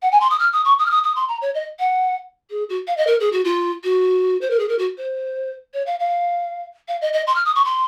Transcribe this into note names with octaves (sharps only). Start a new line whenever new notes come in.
F#5
G#5
C6
D#6
F6
D#6
C#6
D#6
F6
D#6
D#6
C6
A#5
C#5
D#5
F#5
G#4
F#4
F5
D#5
A#4
G#4
F#4
F4
F#4
C5
A#4
G#4
A#4
F#4
C5
C#5
F5
F5
F5
D#5
D#5
C6
F6
D#6
C#6
C6